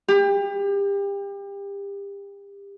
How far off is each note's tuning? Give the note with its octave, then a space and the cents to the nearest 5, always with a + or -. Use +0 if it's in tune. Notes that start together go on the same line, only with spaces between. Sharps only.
G4 +30